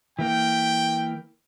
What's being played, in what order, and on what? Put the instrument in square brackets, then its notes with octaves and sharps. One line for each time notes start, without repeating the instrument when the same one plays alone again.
[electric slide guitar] E3 A#3 [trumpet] G5